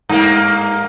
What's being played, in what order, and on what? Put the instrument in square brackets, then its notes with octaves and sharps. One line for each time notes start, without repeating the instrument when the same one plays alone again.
[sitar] G2 A#3